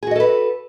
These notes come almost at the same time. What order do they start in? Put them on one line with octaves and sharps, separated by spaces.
G#4 F#4 D#5 A4 B4